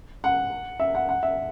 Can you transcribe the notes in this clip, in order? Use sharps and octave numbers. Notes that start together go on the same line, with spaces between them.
F#5
E5
F#5
F#5
E5